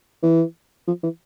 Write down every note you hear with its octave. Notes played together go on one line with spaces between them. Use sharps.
E3
F3
E3